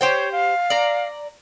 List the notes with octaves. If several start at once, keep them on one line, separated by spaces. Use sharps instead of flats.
G4 C5 C#5 G5
F5
D5 A#5